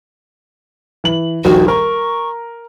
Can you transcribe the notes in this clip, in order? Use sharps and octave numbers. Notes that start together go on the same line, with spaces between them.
E3 F#7
D#1 A#1 D#3 F#4
A#4 C#6